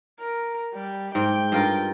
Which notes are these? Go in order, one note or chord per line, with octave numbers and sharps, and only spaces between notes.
A#4
G3
G#2 G5
G2 F4 A#4